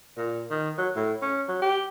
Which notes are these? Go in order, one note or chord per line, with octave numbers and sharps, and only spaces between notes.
A#2
D#3
F#3
A2
C#4
F#3
G4